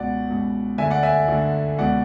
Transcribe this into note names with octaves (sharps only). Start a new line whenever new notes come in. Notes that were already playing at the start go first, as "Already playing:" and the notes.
Already playing: C#2 B2 D5 F#5
C#2 B2
D2 D3 E5 G#5
D5 F#5
E5 G#5
D2 D3
C#2 B2 D5 F#5